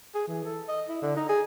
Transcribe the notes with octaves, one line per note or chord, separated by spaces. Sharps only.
G#4
E3
A4
D#5
E4
D3
D#4
G#4